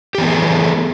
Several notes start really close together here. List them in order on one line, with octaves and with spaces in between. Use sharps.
G4 E3 B3 A3 G#4